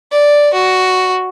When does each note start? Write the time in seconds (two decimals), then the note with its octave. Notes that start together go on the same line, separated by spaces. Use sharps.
0.12 D5
0.53 F#4